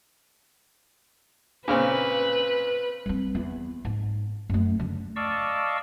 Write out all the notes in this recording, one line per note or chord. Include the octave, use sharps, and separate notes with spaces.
A#2 C#3 C4 B4
G3 C4
E2
G#2
F#2 A3
F#2 D3
D5 D#5 F5 A5 C#6 E6